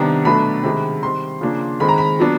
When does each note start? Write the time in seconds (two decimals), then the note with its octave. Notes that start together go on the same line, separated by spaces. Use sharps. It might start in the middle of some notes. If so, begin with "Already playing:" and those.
Already playing: C3 D#3 G3 B3 D4 A#5
0.25 B2 F#3 A3 D4 B5
0.63 C3 D#3 G#3
1.02 D#3 G3 C4 C6
1.41 C#3 F3 A#3 D4
1.80 D#3 G#3 C4 B5
1.89 A#5
1.98 B5
2.19 A#2 F#3 B3 D4